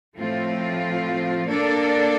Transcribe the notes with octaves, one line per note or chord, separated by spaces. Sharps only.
A2 F3 A3 C4 F4
A#3 D4 A4 D5